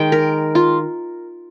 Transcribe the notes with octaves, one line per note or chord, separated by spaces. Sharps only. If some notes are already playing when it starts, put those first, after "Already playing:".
Already playing: D#3 G#3 G5
A#4
F4